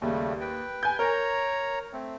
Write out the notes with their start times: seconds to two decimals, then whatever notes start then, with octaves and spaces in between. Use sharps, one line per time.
0.02 D#2 C#3 G3 A3
0.41 B4 G5
0.83 G#5 G6
0.99 A#4 C#5 A#5
1.93 A3 C4